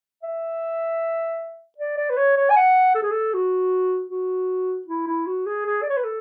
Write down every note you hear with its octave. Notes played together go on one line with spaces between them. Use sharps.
E5
D5
D5
B4
C#5
C#5
G#5
F#5
A4
G#4
A4
F#4
F#4
E4
E4
F#4
G#4
G#4
D5
C#5
B4
A4